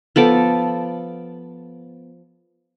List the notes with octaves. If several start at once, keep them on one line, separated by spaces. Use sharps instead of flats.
F3 B3 A4 D6